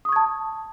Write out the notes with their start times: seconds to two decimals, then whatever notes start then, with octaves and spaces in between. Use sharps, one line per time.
0.05 D#6
0.09 C#6
0.12 G#6
0.16 A5